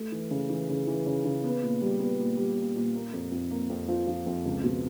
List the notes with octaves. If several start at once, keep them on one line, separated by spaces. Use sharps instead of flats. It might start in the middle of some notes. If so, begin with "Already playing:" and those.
Already playing: A3
E3
C#3
E3
C#3
E3
C#3
C#3
B3
A#2
G3
B3
A#2
G3
A#2
A#2
A#3
F2
F2
A#3
F2
F3
F3
F2
C#2
B2